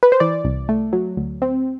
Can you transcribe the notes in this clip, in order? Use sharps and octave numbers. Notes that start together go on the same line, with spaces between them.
B4
C5
E3 D5
C2
A3
F#3
D2
C4